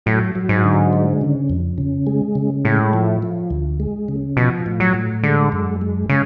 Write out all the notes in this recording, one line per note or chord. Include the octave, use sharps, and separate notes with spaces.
A2 F#3
F#3
G#2
D3
G#3
C#3
F2
C#3
G#3
C#3
A2 G#3
F3
F3
D2
G#3
C#3
B2 F3
A2
F#3
A2
D3 G#3
F#2
G#3
C#3 G#3